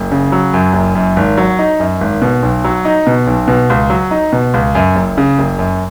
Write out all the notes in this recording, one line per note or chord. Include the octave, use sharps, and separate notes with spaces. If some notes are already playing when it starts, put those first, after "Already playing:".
Already playing: F#1
C#3
F#3
F#2
F#1
F#2
G#1
F#3
D#4
F#2
G#1
B2
B1
F#3
D#4
B2
B1
B2
C#2
F#3
D#4
B2
C#2
F#2
F#1
C#3
F#1
F#2